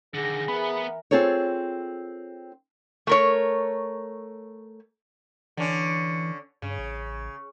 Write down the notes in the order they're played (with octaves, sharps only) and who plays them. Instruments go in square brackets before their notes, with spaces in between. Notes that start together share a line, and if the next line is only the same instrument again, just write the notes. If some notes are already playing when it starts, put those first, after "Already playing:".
[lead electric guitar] D3 D#3 [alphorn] G#4 [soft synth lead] A#6
[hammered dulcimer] E3 A#4 [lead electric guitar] B3 [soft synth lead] B5
[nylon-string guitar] C4 F4 G#4 A4 C#5
[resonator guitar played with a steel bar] A3 A#4 C#5
[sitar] D3 C#4 [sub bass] E3
[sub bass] G2 [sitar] C#3
[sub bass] A1